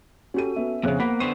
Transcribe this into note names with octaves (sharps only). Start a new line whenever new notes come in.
C#4 F#4 G4 A4 D#7
B3 C#4 E5
F2 A#2 C#3 B3 G#4 C5 C#5 F#6
A#3 F#5 B5 B6
D3 B3 C5 C#6 D#7